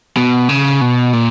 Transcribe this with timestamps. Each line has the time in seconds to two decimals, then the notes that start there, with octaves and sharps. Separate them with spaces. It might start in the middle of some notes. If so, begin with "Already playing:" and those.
0.17 B2
0.49 C#3
0.81 B2
1.13 A#2